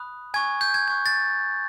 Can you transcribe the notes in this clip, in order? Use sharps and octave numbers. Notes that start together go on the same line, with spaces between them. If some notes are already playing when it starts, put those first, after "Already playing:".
Already playing: B5 D#6 F#6
G#5 C#6 F#6 G#6
G6
G#6
G#5 C#6 F#6 G#6
A6